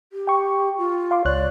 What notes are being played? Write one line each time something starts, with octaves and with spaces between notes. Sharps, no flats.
G4
G5 C#6
F4
F5 C6 D6
C#2 C#5 D5 F#6